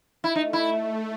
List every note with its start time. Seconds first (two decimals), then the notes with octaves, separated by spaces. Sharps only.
0.24 E4
0.36 A3 D#4
0.53 E4